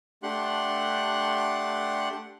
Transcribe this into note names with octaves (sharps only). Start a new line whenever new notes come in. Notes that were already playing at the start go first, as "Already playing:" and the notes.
A3 D4 G4 F#5 C6 F#6